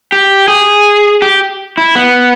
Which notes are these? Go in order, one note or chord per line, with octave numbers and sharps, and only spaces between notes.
G4
G#4
G4
E4
B3